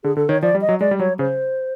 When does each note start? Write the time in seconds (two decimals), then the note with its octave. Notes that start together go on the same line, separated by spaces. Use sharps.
0.04 D3 G#4
0.17 D3 A4
0.29 D#3 C#5
0.42 F3 D5
0.55 G3
0.61 D#5
0.69 F#3
0.81 G#3 D5
0.91 G3
0.99 F#3 C#5
1.19 C#3 C5